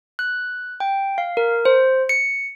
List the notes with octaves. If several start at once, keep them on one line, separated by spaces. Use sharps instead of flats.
F#6
G5
F5
A#4
C5
C#7